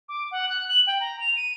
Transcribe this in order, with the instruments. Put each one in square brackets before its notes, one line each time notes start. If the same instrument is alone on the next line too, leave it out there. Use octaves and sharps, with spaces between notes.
[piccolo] D6
F#5
F#6
F#7
G5
A#5
F7
D#7